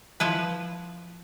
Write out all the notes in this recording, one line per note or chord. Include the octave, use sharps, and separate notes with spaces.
F3 E4 B4